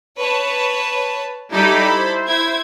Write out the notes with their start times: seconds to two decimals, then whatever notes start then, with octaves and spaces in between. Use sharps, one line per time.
0.18 B4 C#5 A5
1.52 G3 D#4 E4 G4 A4 B5
1.90 C5
2.26 E4 G#6